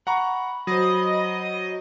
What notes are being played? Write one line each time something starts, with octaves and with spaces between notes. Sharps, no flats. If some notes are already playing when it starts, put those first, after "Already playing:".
F#5 A#5 B5 C#6
F#3 C5 D#5